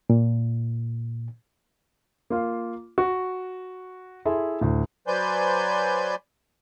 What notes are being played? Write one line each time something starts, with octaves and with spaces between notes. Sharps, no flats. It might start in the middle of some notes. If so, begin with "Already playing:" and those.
A#2
A#3 F4 F5
F#4
E4 G#4 A4 E5 C6
D2 A2
F#3 B4 C5 D5 G#5 G6